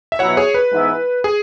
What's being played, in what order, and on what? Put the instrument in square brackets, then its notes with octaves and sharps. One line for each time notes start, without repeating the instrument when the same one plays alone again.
[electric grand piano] E5
[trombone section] B2 F#3 E4 [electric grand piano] C#5 F#5
[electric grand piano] G#4 C#5
B4
[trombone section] G#2 E3 B3 E4
[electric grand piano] G#4